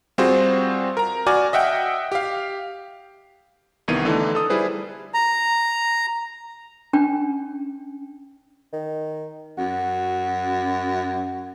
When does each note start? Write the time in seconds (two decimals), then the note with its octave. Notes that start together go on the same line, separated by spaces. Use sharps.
0.18 G3 C4 F4 F#4 G#4 C5
0.97 A#4 A#5
1.26 F#4 D5 G#5 D6 F6
1.53 D#5 E5 F#5 G5
2.12 G4 F5
3.88 C2 D#3 E3 B3 G#6 D#7
4.05 D3 E3 A3 D#4
4.35 A4 D#6
4.50 G3 E4 G#4 B4 C5
5.14 A#5
6.93 C#4 D4 G5
8.73 D#3
9.58 F#2 F#4